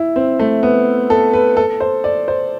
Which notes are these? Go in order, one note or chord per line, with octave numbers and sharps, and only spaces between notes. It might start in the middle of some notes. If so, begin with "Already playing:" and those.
Already playing: E4
C4
A3
B3
A4
B4
A4
C5
D5
C5